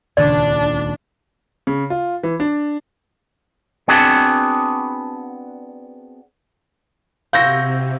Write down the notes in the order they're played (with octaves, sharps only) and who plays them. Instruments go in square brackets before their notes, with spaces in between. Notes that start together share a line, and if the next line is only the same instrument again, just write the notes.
[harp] D#1 C#2 A6 [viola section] D4 [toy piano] D5
[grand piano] C#3
F4
E3
D4
[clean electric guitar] B3 C4 D4 F#4 G#4 A5
[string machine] C3 [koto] C4 E4 F#4 [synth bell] F5 [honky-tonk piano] G6 A#6